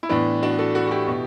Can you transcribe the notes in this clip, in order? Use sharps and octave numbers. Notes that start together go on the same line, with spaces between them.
E4
A2 E3 B3 D4
D4 F#4
F#4 A4
F#4 A4
F#4
E4 G4
B2